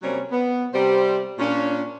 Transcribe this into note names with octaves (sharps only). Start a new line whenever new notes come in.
C3 F#3 G3 A#3 C4 C#4
B3
C3 G3 C5
A#2 C#4 D4